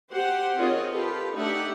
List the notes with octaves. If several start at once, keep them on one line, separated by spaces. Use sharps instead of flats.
G4 C5 F#5
D#3 C4 F4 G#4 C#5 D#5
F4 G4 A4 B4
A3 D4 D#4 G4 E5 F#5